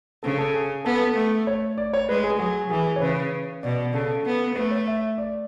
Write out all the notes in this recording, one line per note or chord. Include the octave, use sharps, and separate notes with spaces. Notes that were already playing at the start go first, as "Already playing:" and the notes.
C#3 A4
A4
G#4
B3 A4
A3
C#5
D5
C#5
G#3 B4
G#4
F#3 G#4
E3 G#4
C#5
C#3 B4
B2 D5
C#3 A4
B3
A3 B4
C#5
E5
D5